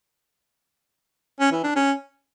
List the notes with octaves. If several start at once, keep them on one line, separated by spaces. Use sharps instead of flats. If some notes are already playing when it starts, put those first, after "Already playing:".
C#4
E3
D4
C#4